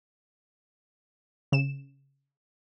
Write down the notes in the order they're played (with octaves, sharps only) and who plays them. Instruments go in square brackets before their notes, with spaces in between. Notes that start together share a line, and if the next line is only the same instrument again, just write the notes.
[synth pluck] C#3 E7